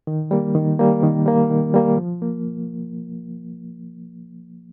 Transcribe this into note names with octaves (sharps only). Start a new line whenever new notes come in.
D#3
G3 A#3
D#3
G3 A#3
D#3
G3 A#3
D#3
G3 A#3
F3
A#3